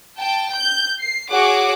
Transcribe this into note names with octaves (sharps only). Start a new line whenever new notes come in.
G5 A5
G6
C7
F#4 G#4 C#5 F#5 D6